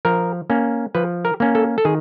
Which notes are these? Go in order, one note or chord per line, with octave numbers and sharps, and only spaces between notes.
F3 A#4
A#3 C#4
F3 B4
A#4
A#3 C#4
A4
A4
D#3 G#4